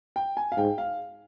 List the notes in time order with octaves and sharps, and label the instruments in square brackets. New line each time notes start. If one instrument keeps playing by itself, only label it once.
[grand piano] G5
G#5
F5
[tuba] G#2 [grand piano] G5
[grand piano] F5